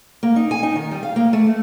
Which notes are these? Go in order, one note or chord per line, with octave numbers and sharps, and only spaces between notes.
A#3
D#4
G#5
D#4
D#3
G3
F5
A#3
A3
A3